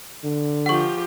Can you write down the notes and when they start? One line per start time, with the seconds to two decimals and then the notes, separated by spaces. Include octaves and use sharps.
0.24 D3
0.66 F3 G4 F#5 C#6